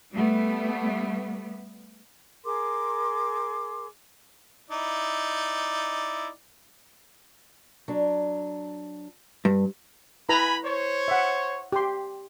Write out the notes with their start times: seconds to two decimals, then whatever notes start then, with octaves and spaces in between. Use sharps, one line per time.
0.12 G3 A3 B3
2.44 G#4 A#4 C6 D6
4.70 D#4 E4 D5
7.88 F#3 D4
9.45 G2
10.29 E4 B4 G#5 A#5 B5
10.64 C5 C#5
11.08 E5 F#5
11.72 G4 C6